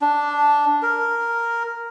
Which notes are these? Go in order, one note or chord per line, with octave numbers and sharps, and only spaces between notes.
D4
A#4